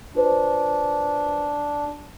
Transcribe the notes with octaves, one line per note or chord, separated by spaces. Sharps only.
D4 F4 B4 C5